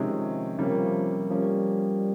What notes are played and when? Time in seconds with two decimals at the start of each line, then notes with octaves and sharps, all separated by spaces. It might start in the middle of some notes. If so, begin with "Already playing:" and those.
Already playing: C3 D#3 F3 G#3 C#4
0.58 C3 F3 G3 A#3 C#4
1.30 F3 G3 A#3 C#4